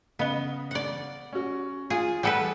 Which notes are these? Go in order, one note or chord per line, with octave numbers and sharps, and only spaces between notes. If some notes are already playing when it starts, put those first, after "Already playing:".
C#3 B3 D#5 G7
D5 F#5
C#4 F#4
F4 G#4
G3 G#4 A4 B4 F#5 C#7